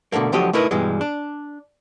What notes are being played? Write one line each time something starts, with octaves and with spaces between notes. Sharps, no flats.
B2 D3 D#3 A3 A#3
D2 D3 F3 F#3 G4 D#5
A3 D#4 E4 A#4 B4
G2 B2 E3 G3 G#3
D4